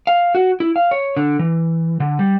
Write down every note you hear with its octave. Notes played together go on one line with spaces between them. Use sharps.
F5
F#4
E4
F5
C#5
D3
E3
D3
G3